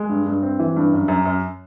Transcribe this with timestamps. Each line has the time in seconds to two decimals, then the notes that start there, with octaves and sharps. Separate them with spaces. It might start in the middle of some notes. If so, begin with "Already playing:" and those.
Already playing: G#3
0.09 G2
0.26 G2
0.42 C4
0.59 E3
0.76 G2
0.92 F#2
1.08 F#2
1.26 F#2